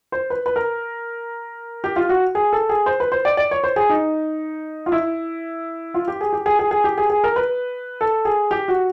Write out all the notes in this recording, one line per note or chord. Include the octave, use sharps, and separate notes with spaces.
C5
B4
B4
A#4
G4
F4
F#4
G#4
A4
G#4
C5
B4
C5
D5
D5
C#5
C5
G#4
D#4
F4
E4
F4
G4
G#4
G4
G#4
G#4
G#4
G4
G#4
G#4
A#4
B4
A4
G#4
G4
F#4